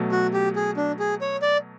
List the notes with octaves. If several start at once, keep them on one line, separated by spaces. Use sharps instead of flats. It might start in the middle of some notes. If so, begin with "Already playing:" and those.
Already playing: B2 F#3 A3
F#4
G4
G#4
D4
G#4
C#5
D5